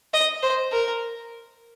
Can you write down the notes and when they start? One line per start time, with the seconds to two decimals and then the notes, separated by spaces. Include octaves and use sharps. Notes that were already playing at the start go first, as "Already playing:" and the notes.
0.14 D#5
0.43 C5
0.72 A#4